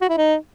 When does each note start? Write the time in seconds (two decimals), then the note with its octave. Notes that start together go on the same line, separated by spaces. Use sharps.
0.01 F#4
0.09 E4
0.17 D#4